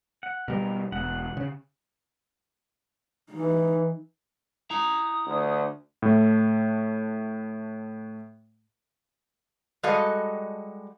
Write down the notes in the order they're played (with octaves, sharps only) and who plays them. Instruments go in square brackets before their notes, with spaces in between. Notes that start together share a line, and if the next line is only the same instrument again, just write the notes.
[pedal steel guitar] F#5
[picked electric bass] B2 G3 [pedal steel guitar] A#4
[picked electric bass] E1 [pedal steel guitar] F#5
[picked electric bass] C#3
[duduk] E3 [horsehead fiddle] D#4
[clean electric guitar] E4 A#5 [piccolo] D#6
[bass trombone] D2
[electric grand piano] A2 A3
[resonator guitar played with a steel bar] G3 G#3 F#4 A4 D#5 F5